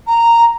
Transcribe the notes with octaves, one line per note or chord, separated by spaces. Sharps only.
A#5